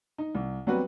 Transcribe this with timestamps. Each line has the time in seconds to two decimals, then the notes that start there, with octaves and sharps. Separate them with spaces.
0.18 D#4
0.35 C2
0.67 F#3 G3 B3 C4 F#4 B4